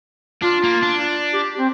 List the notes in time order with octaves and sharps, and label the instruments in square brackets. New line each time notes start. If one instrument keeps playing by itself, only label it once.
[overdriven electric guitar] D4 [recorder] F4
[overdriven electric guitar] A#3
D4
[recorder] G4
C4